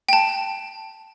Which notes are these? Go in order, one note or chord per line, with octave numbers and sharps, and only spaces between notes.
G5 A5